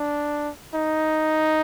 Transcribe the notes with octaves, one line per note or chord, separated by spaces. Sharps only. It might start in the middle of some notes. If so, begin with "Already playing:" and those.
Already playing: D4
D#4